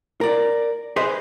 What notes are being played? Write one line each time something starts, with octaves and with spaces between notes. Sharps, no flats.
A#4 D5
G#4 B4 C5 D#5 E5